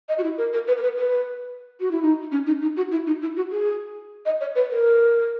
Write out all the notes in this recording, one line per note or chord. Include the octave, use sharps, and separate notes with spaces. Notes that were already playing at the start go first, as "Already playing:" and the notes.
D#5
F#4
E4
A#4
A#4
B4
A#4
B4
B4
F#4
E4
D#4
C#4
D#4
D#4
F#4
E4
D#4
E4
F#4
G#4
D#5
C#5
B4
A#4